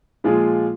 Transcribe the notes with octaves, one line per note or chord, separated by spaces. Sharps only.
A#2 F3 G#3 F4 G#4